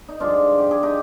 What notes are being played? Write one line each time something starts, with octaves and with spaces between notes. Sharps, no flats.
D#4
G2 D3 F3 G#3 D4 F4
G4
G#4
D#4 G4